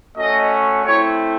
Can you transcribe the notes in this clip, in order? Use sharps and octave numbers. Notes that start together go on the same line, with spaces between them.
A3 C#4 F#4 D#5
A3 C4 E4 C#5